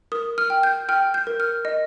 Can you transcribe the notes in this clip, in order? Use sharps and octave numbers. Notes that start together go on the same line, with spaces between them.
A#4 D#6
F6
G5
G6
G5 F6
G6
A#4
F6
D#5